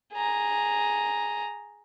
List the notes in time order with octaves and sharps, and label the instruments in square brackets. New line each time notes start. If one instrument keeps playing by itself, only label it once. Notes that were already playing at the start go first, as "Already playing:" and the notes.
[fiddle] G#4 A#5